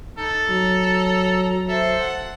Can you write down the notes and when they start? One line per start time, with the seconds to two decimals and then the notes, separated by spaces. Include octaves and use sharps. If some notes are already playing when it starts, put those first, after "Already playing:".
0.18 D#4 A4
0.49 F#3 A#5
1.68 A4 C5 E5
2.01 F#5